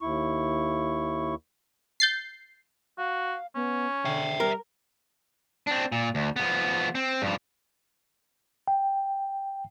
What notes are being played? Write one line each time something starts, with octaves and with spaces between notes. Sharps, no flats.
D#2 E4 C#6
G6 A6 C7
F#4 F5
B3 C#4
D3 E5 G5
G3 A#4
C4 D4
A#2
D2
F3 B3
C4
G2 F3
G5